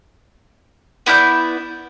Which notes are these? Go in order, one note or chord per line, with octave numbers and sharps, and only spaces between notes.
B3 E4 D5 G6